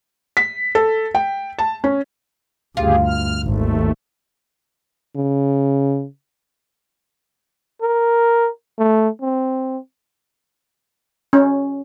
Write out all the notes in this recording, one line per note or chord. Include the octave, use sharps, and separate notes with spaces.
B6
A4
G5
A5
C#4
D2 G2 C#3 F4 G4 G#4
F6
G#1 D#2 A3
C#3
A#4
A3
C4
C#4